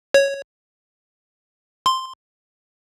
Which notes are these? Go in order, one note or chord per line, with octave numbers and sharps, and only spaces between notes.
C#5
C6